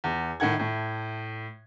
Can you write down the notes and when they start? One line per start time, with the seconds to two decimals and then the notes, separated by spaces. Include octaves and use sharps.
0.04 E2
0.40 A2 D#3 F#5 G#6
0.59 A2